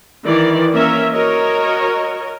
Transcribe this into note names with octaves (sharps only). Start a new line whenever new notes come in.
D#3 E3 D5
A#3 C#4 A#4 E5
F#4 A#4 C#5 D#5